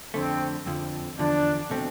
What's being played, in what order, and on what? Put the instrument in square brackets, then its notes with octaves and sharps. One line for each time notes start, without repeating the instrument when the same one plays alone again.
[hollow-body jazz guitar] F2 D3 A3 [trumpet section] C4
[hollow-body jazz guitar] F2 D3 F3
[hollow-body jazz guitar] E2 D3 F3 [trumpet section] D4
[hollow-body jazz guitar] B2 A3 C4